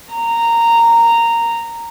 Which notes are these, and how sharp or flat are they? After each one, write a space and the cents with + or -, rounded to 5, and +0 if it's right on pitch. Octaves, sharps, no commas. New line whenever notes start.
A#5 -10